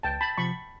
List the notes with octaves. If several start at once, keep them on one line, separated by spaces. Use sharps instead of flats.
C#2 G5 A5
A5 B5
C3 F3 B5 C#6